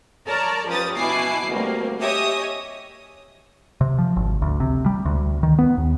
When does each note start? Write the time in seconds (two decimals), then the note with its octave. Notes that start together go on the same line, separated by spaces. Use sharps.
0.27 A#4 C#5 D5 A5 A#5
0.68 F3 C#4 G4 B4 D#6 A6
0.96 B2 E4 G#5 D6 C7
1.49 D2 B2 G3 A#3 C4
2.00 G4 C#5 D#5 E5 G#5 D#6
3.81 C3
3.98 F3
4.16 G#1
4.42 D2
4.60 C3
4.86 G3
5.05 D2
5.43 D#3
5.59 B3
5.78 D#2